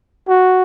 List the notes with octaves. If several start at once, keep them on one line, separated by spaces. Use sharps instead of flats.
F#4